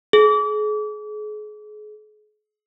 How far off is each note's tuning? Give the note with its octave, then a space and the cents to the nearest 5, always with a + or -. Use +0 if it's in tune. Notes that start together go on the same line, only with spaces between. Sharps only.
G#4 +35